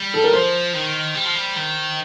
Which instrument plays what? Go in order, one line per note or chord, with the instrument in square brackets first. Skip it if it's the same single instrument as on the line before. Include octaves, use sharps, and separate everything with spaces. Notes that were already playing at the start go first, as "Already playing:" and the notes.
Already playing: [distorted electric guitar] G3
[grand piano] A4
A#4
[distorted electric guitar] F3 [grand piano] C5
[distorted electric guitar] D#3
G3
F3
G3
D#3